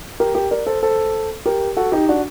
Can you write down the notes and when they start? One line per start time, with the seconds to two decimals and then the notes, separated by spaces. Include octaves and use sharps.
0.20 G4 A#4
0.35 G4 A#4
0.51 A#4 D5
0.67 A4 C5
0.83 A4 C5
1.46 G4 A#4
1.77 F#4 A4
1.92 D#4 G4
2.09 D4 F#4